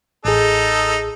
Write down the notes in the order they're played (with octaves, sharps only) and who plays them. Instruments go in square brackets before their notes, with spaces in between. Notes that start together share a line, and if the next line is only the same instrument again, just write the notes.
[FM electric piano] A1 G#4 [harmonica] D#4 A4